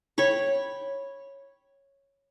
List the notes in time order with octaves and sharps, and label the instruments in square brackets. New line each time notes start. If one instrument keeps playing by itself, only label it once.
[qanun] C#5 G5 B5 C#6